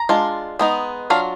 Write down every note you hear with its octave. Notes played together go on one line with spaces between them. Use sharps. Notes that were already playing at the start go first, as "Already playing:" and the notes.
Already playing: A#5
G#3 D4 F4
G#3 B3 D#4
F#3 D4 F4 F5